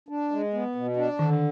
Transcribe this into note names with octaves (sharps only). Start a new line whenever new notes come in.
D4
G#3
B3
B2
D4
D3 D#3